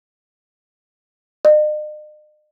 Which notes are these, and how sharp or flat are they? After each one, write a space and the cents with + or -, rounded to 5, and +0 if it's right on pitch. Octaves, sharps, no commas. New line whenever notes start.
D#5 -45